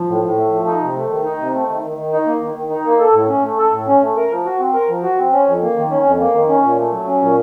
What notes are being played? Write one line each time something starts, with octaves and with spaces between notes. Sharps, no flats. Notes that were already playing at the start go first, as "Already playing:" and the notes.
Already playing: F3
A2
A2
A3
F3
D#4
C3
A3
D#3
D#4
C3
A3
D#3
D#3
D#3
D#4
A#3
D#3
D#3
D#4
A#3
A4
A2
C#4
A3
A4
A2
C#4
A3
A#4
F3
F#4
C4
A#4
F3
F#4
C4
C#4
F2
A#3
D#3
C#4
F2
A#3
D#3
C#4
A#2
A3
F#3
C#4
A#2